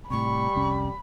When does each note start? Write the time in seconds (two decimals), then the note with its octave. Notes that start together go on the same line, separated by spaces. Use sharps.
0.10 A2 C3 G3 B5 C#6
0.55 F1 C2 C#4